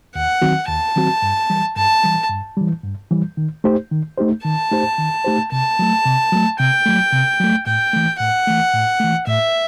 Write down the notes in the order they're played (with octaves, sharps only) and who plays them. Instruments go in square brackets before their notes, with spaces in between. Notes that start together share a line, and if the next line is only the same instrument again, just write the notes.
[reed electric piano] D#2 [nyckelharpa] F#5
[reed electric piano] D#3 F#3 C4 F#4
[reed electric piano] D#2 [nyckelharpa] A5
[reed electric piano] D#3 F#3 C4 F#4
G2
E3 G3
[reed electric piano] G2 [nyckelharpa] A5
[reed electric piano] E3 G3
G2
E3 G3
G2
E3 G3
D#3
A3 D#4 G4 C5
D#3
A3 D#4 G4 C5
[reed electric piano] D#3 [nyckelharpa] A5
[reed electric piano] A3 D#4 G4 C5
D#3
A3 D#4 G4 C5
[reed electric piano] C3 [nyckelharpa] A5
[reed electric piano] F#3 A3
C3
F#3 A3
[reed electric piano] C3 [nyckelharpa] G5
[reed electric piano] F#3 A3
C3
F#3 A3
[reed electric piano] A2 [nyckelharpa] G5
[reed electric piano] E3 A3
[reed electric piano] A2 [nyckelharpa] F#5
[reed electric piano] E3 A3
A2
E3 A3
[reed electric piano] A2 [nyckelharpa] E5